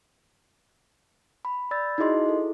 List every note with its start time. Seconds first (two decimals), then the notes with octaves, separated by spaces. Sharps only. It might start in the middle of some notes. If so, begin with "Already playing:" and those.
1.45 B5
1.71 D5 B5 E6 G6 A6
1.98 D#4 E4 F#4 G#4 D#5 C6
2.26 E4 G#4 A4